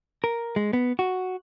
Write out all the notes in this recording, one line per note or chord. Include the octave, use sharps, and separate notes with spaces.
A#4
G#3
B3
F#4